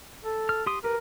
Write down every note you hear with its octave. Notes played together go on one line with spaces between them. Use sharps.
A4
F6
G4 C6 D#6
G4 A#4 B4